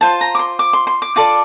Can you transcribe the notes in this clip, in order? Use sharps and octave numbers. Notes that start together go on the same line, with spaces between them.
F4 C5 A5
A#5
D6
C6
D6
C6
C6
D6
F4 A4 D5 D6